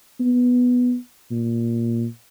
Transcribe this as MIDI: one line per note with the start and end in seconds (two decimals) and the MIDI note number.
0.20 0.96 59
1.31 2.06 46